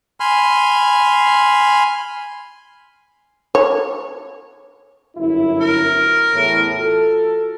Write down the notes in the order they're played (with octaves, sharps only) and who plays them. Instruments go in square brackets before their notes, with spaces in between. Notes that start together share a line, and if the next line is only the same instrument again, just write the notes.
[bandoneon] G#5 B5 C6 F6
[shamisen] C#5
[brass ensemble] G1 F#2 E4
[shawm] A#4
[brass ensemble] E2 A2
F4 F#4 A4